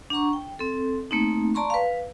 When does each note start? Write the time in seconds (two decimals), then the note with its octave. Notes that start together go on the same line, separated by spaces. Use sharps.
0.10 D4 F#5 A#5 C#6
0.33 G5
0.59 C4 A4
1.11 A3 A#3 C4 D#4
1.55 D5 A5 A#5 C6 C#6
1.70 B4 F5